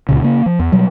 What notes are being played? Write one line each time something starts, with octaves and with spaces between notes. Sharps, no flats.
C#2 A#2 C#3
C#3 A#3
F3
E2
B2 F#3 G3